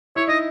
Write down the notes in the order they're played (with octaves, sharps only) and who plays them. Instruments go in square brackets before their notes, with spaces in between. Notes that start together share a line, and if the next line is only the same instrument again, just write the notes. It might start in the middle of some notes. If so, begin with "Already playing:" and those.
[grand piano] E4 [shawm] C#5
[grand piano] D#4 [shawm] D#5